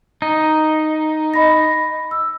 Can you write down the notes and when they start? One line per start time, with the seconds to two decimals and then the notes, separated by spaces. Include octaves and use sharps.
0.22 D#4
1.34 D#5 B5 A#6
2.11 E6